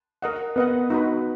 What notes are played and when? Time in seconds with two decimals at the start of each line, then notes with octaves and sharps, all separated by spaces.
0.22 A#4 D#5 F#5
0.56 B3 A#4 D#5 F#5
0.90 D#4 F#4 B4